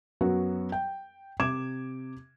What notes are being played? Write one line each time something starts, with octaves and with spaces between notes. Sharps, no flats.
F#2 F#3 B3 F#4
G5
C3 D6 G#6 E7